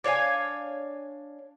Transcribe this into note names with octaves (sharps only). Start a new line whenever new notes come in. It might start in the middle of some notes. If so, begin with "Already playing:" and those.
D4 C#5 F5 G#5